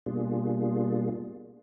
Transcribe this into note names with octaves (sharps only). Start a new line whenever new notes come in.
B2 G3 A#3 D4 F4 G#4